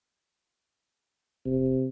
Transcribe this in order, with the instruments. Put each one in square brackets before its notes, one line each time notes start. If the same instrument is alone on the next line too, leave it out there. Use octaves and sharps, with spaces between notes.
[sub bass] F1 [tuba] C3